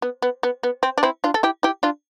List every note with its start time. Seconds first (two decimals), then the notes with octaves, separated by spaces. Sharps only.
0.02 B3
0.22 B3
0.43 B3
0.63 B3
0.83 C4
0.98 D4
1.03 C4 E4
1.24 D4 F4
1.34 A4
1.43 E4 G4
1.63 E4 G4
1.83 D4 F4